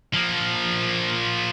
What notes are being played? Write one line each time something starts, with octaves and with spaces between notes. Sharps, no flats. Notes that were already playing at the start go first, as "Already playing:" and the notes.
F3 A#3